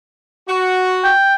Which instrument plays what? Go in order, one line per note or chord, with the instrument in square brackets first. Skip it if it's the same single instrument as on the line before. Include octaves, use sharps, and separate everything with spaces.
[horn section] F#4
[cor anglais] G5